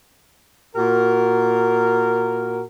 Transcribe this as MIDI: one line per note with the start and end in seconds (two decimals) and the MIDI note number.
0.76 2.63 46
0.76 2.63 66
0.76 2.63 70